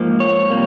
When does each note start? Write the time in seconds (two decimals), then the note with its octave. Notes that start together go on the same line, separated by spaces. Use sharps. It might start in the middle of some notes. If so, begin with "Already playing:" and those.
Already playing: G#2 F3 A#3
0.20 C#5
0.50 C3 G3 A#3